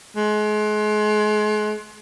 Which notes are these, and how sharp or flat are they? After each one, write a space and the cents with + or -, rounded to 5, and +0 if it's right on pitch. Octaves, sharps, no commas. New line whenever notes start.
G#3 +35